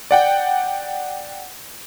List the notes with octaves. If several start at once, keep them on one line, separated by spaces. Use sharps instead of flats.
D5 F#5 G5